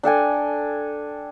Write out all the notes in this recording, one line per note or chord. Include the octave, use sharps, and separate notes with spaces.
D4 A4 G5 G#5